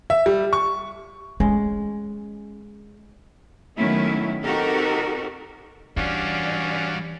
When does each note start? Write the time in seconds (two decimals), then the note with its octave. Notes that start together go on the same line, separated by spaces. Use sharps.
0.10 E5
0.26 G3
0.53 C#6
1.40 G#3 C#4
3.76 D#3 F#3 A3 B3 C#4 E4
4.43 C4 D#4 F#4 G4 A4 A#4
5.97 E3 G3 C#4 D4 F#4 D5 F5